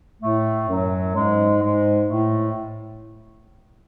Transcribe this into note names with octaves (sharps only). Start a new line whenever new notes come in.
A2 A3
F#2 F#3
G#2 G#3
G#2 G#3
A2 A3